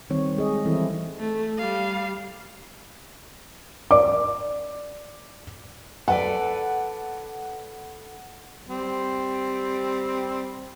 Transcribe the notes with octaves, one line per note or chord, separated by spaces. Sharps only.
D#3 G3 C4 C#5
G#3 G#4 D#5
D#3 E3 G3 C4 E4 A4
A3
G3 F5
D5 D6
A4 B4 D5 F#5
G3 C4